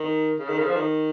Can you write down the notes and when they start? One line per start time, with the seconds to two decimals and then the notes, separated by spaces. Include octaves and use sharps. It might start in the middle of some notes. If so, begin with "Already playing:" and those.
Already playing: D#3
0.39 C#3
0.49 D#3
0.58 C#3
0.67 F3
0.76 D#3